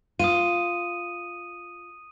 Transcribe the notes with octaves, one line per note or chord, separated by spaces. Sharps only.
F4 D#6 D#7